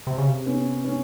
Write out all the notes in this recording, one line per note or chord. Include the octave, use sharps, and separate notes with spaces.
C3
C#3
C3
B3 C#4
B3 C#4